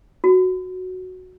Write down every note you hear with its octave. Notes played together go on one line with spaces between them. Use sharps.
F#4